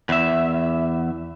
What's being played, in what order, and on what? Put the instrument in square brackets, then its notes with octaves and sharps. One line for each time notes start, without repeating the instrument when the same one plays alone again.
[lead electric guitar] E2 E5